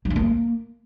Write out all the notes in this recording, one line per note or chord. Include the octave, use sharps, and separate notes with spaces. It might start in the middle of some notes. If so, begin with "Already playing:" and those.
F#3
D4
A#3